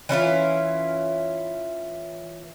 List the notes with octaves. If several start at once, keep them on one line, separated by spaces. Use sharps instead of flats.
E3 C#4 E4 F4